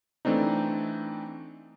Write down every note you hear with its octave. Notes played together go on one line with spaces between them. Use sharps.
E3 A3 C4 D4 D#4